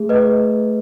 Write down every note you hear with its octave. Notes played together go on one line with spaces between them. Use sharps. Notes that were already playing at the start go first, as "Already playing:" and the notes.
Already playing: A3 G#4
B4 D#5